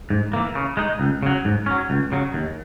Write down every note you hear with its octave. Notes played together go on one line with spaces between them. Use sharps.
G#2
E3 A#3
C#3
G#3 D#4
C#2
C#3 F#3
G#2
F#3 C#4
C#2
C#3 F#3
D#2